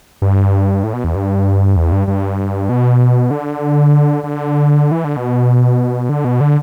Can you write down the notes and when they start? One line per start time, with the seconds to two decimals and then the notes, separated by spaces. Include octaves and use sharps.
0.22 G2
0.84 A2
0.93 B2
1.04 E2
1.15 G2
1.76 E2
1.92 G2
2.08 G2
2.69 B2
3.31 D3
4.24 D3
4.91 E3
5.04 D3
5.17 B2
6.09 D3
6.25 B2
6.41 D3